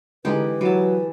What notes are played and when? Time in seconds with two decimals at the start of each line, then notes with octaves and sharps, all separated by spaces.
0.25 D3 E3 G#3 D#4 G4 B4
0.61 E3 F#3 A5